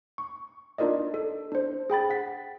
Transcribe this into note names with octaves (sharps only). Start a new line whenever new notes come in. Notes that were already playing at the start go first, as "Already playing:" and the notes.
C#6
D4 D#4 F4 A#4 D5 D#5
A4
D4 C5
G#4 G5 B5 A6
F#5 B6